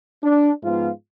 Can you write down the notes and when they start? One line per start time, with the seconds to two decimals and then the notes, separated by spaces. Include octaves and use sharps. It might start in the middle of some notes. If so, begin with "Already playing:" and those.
0.23 D4
0.62 G#2 F3 G#3 B3 F4